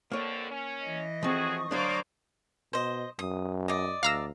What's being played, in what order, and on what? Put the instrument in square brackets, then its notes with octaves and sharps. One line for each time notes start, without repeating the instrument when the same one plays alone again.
[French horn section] F2 D3 [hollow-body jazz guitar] A#3 C#5
[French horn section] C#4
[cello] E3 D#5
[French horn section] A2 F#4 G#4 [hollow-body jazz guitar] F3 C4 [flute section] C#6 D#6
[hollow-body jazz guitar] D2 F#3 D4 [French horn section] A#3 [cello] C5 D5
[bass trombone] B2 [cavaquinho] C5 D#5
[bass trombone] F#2 [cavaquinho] D#6
[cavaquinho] D5 D#5
[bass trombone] D2 [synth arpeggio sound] F5 A#5 E6